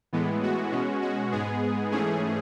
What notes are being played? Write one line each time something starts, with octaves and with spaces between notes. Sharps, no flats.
A2 E3 G#3 B3
F#4
B2 G#3 C#4
F#4
G#2 G#3 B3 G#4
G#2 E3 A3 C#4 G#4